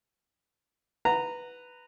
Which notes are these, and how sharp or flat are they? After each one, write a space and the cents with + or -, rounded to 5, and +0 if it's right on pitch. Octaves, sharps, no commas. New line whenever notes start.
B4 +0 A#5 -15